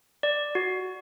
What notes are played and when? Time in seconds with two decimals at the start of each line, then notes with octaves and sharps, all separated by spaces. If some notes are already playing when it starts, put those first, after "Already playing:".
0.23 D5
0.55 F#4